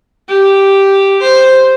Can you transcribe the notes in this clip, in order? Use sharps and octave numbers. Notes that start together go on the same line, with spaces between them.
G4
C5